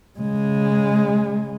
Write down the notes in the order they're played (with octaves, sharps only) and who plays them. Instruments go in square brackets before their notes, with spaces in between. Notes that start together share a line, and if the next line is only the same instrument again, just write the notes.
[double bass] C#3 G#3